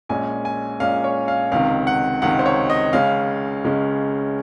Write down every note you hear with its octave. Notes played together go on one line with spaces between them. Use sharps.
A#1 A#2 G#3 C#4 G#5
G#5
A#1 A#2 G#3 C#4 F5
C#5
F5
C#2 C3 D#3 F5
F#5
C#2 C3 D#3 F#5
C5
C#5
D#5
C#2 C#3 G#3 C#4 F5
C#2 C#3 G#3 C#4